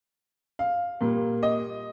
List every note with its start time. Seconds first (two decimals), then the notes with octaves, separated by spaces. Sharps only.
0.59 F5
1.01 A#2 G3 A#3
1.43 D#5